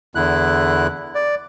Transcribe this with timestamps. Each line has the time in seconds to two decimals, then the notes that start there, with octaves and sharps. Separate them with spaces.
0.15 E2 D3 E4 F#6
1.15 D5